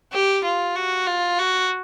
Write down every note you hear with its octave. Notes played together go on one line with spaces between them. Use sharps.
G4
F4
F#4
F4
F#4